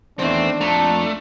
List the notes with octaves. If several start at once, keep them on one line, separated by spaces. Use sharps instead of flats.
E2 D#3 E3 A3 C4 D4 C5
F2 A3 F4 A5 A#5